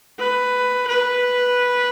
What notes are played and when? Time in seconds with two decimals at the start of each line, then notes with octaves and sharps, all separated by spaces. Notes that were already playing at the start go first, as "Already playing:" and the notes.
0.20 B4
0.87 B4